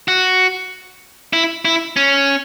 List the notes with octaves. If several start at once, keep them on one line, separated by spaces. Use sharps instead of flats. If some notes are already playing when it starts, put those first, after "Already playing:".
F#4
E4
E4
C#4